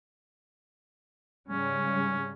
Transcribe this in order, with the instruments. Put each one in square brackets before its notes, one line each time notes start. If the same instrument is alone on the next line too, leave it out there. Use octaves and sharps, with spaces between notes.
[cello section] G#2 C#3 G3 [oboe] C#4